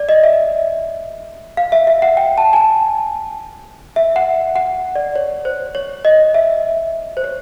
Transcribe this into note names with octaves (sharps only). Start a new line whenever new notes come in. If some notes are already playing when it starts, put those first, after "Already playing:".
Already playing: D5
D#5
E5
F5
E5
E5
F#5
G5
A5
G#5
A5
E5
F#5
F#5
D5
C#5
C5
C#5
D#5
E5
C5
C#5